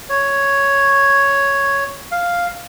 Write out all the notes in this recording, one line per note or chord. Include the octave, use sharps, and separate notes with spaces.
C#5
F5